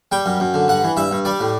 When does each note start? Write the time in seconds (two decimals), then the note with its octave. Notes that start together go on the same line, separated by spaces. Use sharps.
0.12 G3 G5
0.26 F#2
0.40 F#2
0.54 D3
0.68 G2 F#5
0.84 E3
0.97 G2 E5
1.11 G2
1.25 G3 D5
1.40 A2